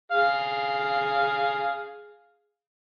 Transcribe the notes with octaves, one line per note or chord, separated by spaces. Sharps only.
G#4 F5